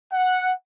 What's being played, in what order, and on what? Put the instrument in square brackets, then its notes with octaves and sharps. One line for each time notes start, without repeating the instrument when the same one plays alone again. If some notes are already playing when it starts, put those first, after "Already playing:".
[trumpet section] F#5